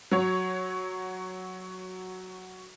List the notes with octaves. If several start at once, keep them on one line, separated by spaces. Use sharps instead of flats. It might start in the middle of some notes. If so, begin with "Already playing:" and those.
F#3 C#5